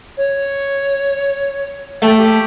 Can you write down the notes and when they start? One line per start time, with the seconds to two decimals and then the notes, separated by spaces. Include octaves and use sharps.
0.17 C#5
2.02 A3 A4 E5 G5
2.17 G4